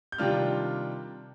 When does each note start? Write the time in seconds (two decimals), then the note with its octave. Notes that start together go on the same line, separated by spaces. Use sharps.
0.12 G6
0.18 C3 D#3 G3 D4 F4 F6